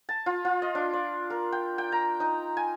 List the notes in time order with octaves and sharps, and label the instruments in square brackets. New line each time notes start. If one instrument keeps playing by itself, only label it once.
[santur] A5
F4
F4
D#5
D4
D5
A#4
G5
G5
A#5
D#4
G#5